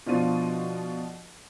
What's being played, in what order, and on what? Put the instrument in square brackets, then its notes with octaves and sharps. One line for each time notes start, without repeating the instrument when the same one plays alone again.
[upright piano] B2 F3 D4 F4 D5 D#7